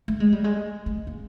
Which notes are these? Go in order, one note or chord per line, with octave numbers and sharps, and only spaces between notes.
A3
G#3
G3
G#3
A3
A#3